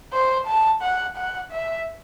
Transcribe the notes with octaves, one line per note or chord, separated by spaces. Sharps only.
C5
A5
F#5
F#5
E5